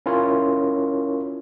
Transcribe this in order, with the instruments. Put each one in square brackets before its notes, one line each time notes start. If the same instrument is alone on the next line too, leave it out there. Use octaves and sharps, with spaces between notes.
[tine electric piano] C#4 E4 F4 A#4 C#5